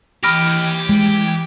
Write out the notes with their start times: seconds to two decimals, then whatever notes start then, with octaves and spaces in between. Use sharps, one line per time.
0.24 E3 G4 D#5 G5 B5 F6 G#6 A#6
0.89 G#3